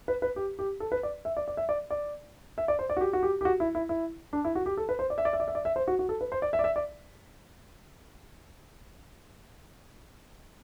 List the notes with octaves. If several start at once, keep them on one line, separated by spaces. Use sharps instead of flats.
B4
B4
G4
G4
A4
B4
D5
E5
D5
D5
E5
D5
D5
E5
D5
C5
D5
F#4
G4
F#4
G4
G4
F#4
E4
E4
E4
D4
E4
F#4
G4
A4
B4
C5
D5
E5
D5
E5
D5
E5
D5
E5
C5
F#4
F#4
A4
B4
C5
D5
E5
D5
E5
D5